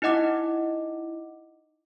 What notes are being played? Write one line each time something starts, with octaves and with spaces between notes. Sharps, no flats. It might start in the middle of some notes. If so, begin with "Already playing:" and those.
D#4 E4 D#5 F#5 D6